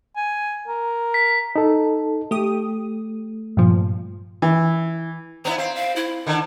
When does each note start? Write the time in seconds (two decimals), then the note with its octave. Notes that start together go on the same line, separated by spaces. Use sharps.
0.17 G#5
0.68 A#4
1.14 B6
1.56 D#4 A4
2.31 A3 G4 D#6
3.57 G2 A#2 F3
4.42 E3
5.45 B3 C#4 E4 A#5
5.58 C4 F5
5.75 F5
5.96 E4
6.27 D3 D#3